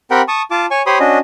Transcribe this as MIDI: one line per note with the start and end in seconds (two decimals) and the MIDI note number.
0.11 0.22 60
0.11 0.22 67
0.11 0.22 70
0.11 0.22 78
0.11 0.22 79
0.11 0.22 83
0.28 0.42 81
0.28 0.42 85
0.28 0.42 87
0.51 0.66 65
0.51 0.66 81
0.51 0.66 86
0.71 0.82 73
0.71 0.82 80
0.71 0.82 85
0.86 0.98 67
0.86 0.98 72
0.86 0.98 73
0.86 0.98 83
0.86 0.98 84
0.86 0.98 87
1.00 1.19 61
1.00 1.19 62
1.00 1.19 66
1.00 1.19 75